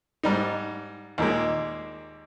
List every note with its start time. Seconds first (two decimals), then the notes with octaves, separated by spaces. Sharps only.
0.23 G#2 G3 D#4
1.18 D#2 A#2 G#3